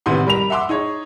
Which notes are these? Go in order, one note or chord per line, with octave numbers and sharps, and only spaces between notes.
A1 C3 D#3 B3 C6
G3 A#4 B5 F7
E5 F#5 C6 D6 E6
D#4 G#4 C#5